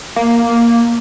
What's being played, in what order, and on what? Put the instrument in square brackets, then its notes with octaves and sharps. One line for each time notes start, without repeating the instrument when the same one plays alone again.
[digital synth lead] A#3